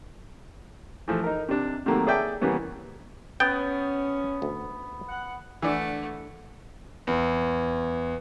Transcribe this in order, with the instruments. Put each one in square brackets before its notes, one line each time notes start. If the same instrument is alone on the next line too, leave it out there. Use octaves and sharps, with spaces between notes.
[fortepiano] E3 F3 A3
D#4 A#4
C3 D4
C3 D#3 F#3 A3 A#3
G#4 C#5 D5 E5 G5 A5
C#3 E3 G3 A#3 B3 C#4
[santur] B3 [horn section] C#4 [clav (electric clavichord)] G5
[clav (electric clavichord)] D2
[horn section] F#5
[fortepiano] E3 D5 [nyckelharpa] A3 F#5 [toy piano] D4 E6
[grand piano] E2